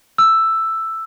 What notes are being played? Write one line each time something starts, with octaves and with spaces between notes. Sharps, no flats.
E6